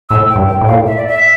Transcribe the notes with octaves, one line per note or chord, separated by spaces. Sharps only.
A2 E6
G5
G2
G5
A2
A#2 F5
A2
E5
D5
E5